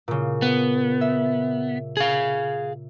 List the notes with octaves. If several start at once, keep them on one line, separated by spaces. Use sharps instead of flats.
A#2 C#3
B3
E5
G#4 F5